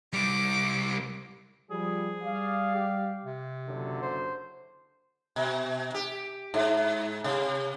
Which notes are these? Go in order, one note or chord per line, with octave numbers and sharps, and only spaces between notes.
C2 G3 D6
F3 G3 G#4
G3 D5 F5
G4
C3
F#1 D3 F#3
C5
B2
G4
G#2
C3